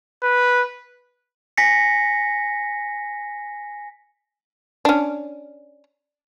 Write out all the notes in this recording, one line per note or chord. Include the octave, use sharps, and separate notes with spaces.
B4
G#5 A#6 B6 C#7
C#4 D4